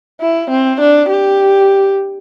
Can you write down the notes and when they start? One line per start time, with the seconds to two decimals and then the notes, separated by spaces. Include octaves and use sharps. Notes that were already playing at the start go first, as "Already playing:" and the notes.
0.21 E4
0.50 C4
0.80 D4
1.09 G4